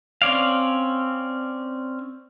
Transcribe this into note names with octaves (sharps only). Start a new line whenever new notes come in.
C4 C#4 D5 F5